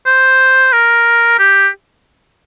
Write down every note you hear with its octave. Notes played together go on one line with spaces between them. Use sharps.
C5
A#4
G4